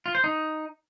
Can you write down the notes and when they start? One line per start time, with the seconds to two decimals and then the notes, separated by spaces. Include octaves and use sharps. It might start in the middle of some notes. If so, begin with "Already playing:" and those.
0.06 F4
0.15 C5
0.24 D#4